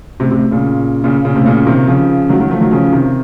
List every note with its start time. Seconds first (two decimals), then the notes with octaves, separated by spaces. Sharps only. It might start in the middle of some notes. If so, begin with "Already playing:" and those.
0.20 A2 C3
0.30 A2 C3
0.51 A#2 C#3
1.04 A#2 C#3
1.25 A#2 C#3
1.35 A2 C3
1.46 A#2 C#3
1.67 C3 D#3
1.88 C#3 F3
2.29 D#3 F#3
2.40 D#3 F#3
2.50 F3 A3
2.61 D#3 F#3
2.71 C#3 F3
2.92 C3 D#3